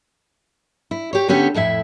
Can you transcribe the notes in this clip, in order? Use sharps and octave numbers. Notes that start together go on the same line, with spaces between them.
E4
G4 C#5
D3 B3 C#4 G4 A4
F2 A2 E4 E5